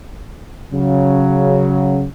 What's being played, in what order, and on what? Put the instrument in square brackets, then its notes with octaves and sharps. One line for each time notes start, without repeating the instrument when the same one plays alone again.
[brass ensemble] C#3 F#3